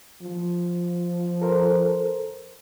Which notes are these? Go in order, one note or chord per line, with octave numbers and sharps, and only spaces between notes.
F3
A4 A#4 C5